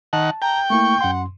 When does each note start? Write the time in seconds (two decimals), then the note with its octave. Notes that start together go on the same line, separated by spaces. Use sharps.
0.13 D#3 F#5 A5
0.42 G5 A#5
0.70 A3 A#3 E4 C#6
1.01 F#2 F#5 C6